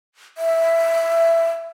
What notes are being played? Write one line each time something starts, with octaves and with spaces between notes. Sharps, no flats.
E5